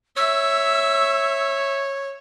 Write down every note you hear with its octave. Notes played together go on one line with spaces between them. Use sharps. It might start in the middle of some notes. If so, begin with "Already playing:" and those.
C#5 E5 E6